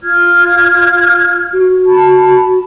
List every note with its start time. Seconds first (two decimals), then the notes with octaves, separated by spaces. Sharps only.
0.02 F4 F6 G#6
1.53 F#4
1.86 A5 B5